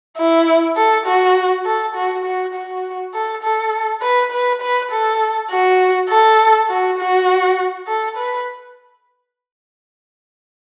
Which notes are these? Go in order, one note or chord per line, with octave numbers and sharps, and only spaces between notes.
E4
A4
F#4
A4
F#4
F#4
F#4
A4
A4
B4
B4
B4
A4
F#4
A4
F#4
F#4
A4
B4